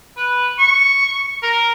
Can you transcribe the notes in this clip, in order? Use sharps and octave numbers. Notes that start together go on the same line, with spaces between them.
B4
C#6
A#4